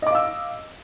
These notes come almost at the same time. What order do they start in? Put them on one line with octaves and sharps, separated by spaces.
D#5 D6 F5 E6